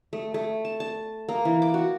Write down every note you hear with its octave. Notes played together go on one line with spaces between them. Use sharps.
A3
A3
A5
A5
A#3
E3
D6
F#4